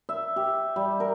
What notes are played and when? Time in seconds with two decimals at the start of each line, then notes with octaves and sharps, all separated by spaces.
0.09 E5
0.36 G4
0.76 G3
1.00 A#4